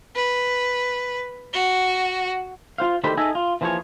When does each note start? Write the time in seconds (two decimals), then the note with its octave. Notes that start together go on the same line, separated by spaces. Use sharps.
0.16 B4
1.53 F#4
2.78 F4 C5 F5
3.04 D2 D#3 A3 G4 C5 B5
3.17 D#4 G#4 A4 D#5 E5 G#5
3.35 F4
3.61 E3 F3 A#3 E4 G#4 C#5